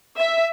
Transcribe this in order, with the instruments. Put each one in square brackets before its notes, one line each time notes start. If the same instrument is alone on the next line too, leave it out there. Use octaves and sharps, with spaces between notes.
[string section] E5